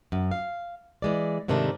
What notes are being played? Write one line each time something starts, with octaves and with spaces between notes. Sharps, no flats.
F#2
F5
E3 G#3 D5
G#2 C3 D#3 A3 D4